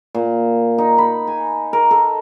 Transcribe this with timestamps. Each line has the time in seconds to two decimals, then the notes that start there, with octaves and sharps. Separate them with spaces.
0.15 A#2
0.78 D#4
0.98 B5
1.27 G#5
1.73 A#4
1.91 A4